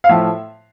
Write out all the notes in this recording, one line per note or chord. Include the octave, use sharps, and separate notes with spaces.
F5
A2 F3 E5